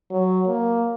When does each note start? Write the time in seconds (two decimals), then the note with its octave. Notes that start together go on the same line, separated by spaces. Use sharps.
0.11 F#3
0.47 A#3